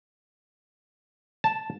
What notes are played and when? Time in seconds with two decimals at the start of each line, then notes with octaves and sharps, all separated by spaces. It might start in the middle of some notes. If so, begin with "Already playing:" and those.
1.44 A5